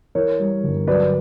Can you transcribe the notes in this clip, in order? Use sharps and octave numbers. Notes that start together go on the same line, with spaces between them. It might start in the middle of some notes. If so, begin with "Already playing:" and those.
E3 A#4 C#5
G3
G1
F#3 B4 D5